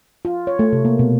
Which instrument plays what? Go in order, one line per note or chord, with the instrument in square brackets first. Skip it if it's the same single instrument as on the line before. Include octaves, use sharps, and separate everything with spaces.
[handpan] F4
C#5
A3
C3
A#3
B2